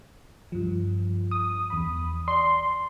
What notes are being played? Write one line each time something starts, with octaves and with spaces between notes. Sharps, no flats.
G2 F3
D#6
E2 B5
D5 C6